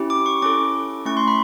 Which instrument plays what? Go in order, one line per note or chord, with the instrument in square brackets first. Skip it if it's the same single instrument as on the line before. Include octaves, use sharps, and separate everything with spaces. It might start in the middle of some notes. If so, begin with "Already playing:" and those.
Already playing: [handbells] C#4 E4 G4
D6
C#6
C#4 E4 A4 D6
A3 C#4 E4 C#6
C6
B5